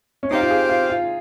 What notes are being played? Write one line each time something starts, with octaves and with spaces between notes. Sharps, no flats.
C#4
C4 D#4 G4 C5 F5
F4
G#4
F4
F4